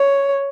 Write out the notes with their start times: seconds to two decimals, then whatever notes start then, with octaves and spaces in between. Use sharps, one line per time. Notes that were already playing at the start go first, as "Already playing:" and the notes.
Already playing: C#5